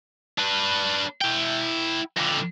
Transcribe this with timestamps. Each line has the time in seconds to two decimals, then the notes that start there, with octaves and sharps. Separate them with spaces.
0.38 D4 B4
1.21 E4 G5
2.17 F2 D3